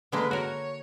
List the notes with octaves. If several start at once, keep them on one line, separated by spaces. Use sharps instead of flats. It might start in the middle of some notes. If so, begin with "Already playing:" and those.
D3 G#3 A#3 B4
F#4 A#4 C#5